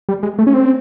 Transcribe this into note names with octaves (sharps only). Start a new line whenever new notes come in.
G3
G#3
A3
C#4
C4